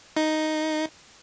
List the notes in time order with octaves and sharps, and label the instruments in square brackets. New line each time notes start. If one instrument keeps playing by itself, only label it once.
[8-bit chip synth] D#4